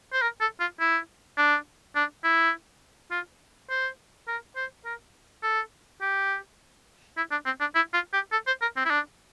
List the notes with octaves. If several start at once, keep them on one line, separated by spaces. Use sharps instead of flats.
C5
A#4
A4
F4
E4
D4
D4
E4
F4
C5
A#4
C5
A#4
A4
G4
E4
D4
C4
D4
E4
F4
G4
A4
C5
A#4
C4
E4
D4